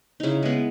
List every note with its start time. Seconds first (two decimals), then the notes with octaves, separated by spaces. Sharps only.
0.20 C#3 D#4 E4
0.43 G#3 B3